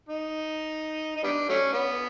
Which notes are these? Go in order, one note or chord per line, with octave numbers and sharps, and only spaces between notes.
D#4
D#4
G3 B3 D4
F#3 A3 C#4
B3